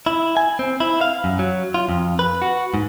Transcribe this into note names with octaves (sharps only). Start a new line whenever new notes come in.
E4
G#5
C4
E4
F5
F#2
F#3
F4
F2
B4
F#4
G#2